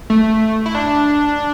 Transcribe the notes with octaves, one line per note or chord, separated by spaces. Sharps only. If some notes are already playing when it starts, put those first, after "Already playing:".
A3
E4
D4